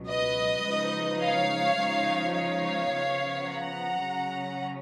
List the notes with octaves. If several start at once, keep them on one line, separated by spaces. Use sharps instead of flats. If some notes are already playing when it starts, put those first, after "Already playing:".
Already playing: C#2 B2 F#3
B4 D#5
C#3 F3 G#3 D#4
C#5 F5
C#3 F3 G#3 D#4
C#5 F5
C#3 F3 B3
F#5 A#5
C#3 F#3 C#4